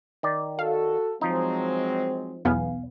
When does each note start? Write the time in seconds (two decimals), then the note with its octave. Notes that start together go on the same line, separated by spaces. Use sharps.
0.23 D#3 D5
0.59 F#4 A4 F5
1.21 F3 F#3 G#3 C4 D#4
2.45 B1 E2 B3 F5 G#5